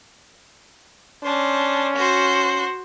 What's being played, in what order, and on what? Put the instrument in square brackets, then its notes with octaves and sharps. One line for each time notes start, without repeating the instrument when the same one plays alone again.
[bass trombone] C#4 [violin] D4 C5
[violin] F#4 C5